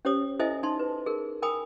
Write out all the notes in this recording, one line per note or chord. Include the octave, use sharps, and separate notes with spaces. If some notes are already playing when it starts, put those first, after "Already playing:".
C#4 G4 C5 C#5 D#6
E4 A4 C5 D#5 E5 G#5
D#4 A5 C6
B4
G#4 A#4
A#4 G5 G#5 B5 D#6